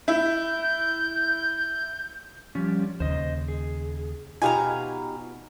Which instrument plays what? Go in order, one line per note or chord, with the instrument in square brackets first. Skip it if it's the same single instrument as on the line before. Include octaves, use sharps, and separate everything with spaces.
[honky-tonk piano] E4 [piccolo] G6
[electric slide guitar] F3 G3 C#4
[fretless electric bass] D#2 C#3 [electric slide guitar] C5 D#5
[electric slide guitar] G#4
[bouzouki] B2 F5 A#5 [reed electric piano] D#4 F4 G4 [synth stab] G#5